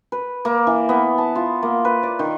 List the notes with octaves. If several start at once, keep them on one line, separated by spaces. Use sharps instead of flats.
B4
A#3
E3
B3
A5
F4
A#3
B4
D5
D#3